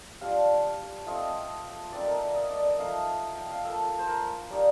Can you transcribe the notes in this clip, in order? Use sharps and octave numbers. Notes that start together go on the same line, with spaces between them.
G3 D4 F4 F5
A3 C4 F4 D#5
A3 C4 D#4 D5
A#4
D5
D#5
D5
D#5
F3 A3 D#4 F5
G5
F5
A#3 F4 A4
C5
A#4
G3 A#3 D#4 D5